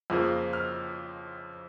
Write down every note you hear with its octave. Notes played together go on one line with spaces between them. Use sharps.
F2 C#3 F3 A#3
F6